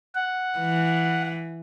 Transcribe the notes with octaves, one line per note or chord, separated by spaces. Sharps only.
F#5
E3